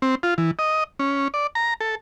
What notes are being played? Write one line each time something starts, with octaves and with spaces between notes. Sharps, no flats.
C4
F4
E3
D#5
C#4
D5
A#5
A4